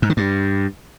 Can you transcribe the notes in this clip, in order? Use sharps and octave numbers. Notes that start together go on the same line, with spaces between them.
G#2
D#3
G2